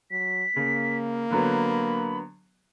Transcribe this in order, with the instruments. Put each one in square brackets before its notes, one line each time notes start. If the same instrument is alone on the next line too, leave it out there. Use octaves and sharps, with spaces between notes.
[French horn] F#3 [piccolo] B6
[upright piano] C#3 [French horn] A#3
[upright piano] D3 F#3 B3 [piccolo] B5